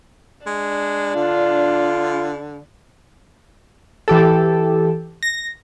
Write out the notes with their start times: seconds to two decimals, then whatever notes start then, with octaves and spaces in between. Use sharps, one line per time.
0.46 G#3 D4
1.16 D3 F4
4.08 E3 G4 A4
5.23 A#6